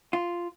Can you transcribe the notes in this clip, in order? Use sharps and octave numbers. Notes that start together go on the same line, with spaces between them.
F4